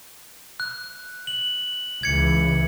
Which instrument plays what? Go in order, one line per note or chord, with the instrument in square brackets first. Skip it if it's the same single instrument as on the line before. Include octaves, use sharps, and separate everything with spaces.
[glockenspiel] F#6
F#7
[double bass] C#2 E3 [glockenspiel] G#6 C#7